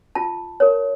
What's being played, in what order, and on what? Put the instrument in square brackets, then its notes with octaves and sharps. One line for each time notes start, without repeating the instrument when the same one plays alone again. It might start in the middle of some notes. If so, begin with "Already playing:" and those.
[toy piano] F4 A5
A#4 C#5